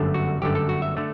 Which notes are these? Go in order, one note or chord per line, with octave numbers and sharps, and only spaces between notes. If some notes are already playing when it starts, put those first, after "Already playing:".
Already playing: G1 F#2 D3 A3
F#4
G1 F#2 D3 A3 G4
A4
F#4
E5
D3 A3